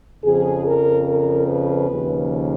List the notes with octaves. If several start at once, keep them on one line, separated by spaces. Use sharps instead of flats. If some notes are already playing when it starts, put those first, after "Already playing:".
F2 C#3 F3 G#4
A#4
A#4
B4
D#2 C#3 F3